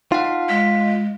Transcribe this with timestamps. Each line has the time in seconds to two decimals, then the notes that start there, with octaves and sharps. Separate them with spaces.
0.12 D#4 F4 F5 F#5
0.49 G#3 B6